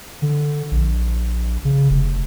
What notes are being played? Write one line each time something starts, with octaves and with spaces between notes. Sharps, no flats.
D3
A#1
C#3
F1